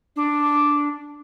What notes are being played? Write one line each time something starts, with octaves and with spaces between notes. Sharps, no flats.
D4